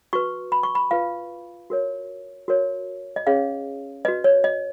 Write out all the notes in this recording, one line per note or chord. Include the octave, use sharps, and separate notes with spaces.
F#4 B4 C#6
B5
C#6
B5
F4 B4 F5
F#4 A#4 C#5
F#4 A#4 C#5
D#5
C#4 G#4 C#5 F5
F#4 B4 D#5
C#5
D#5